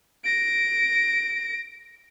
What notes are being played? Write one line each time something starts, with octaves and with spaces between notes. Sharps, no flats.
A#6 D7